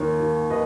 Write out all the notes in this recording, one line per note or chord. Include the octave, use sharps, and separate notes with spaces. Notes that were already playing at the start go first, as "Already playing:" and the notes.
Already playing: D#2 D#3 C#5
D#3
D#3 B4 D#5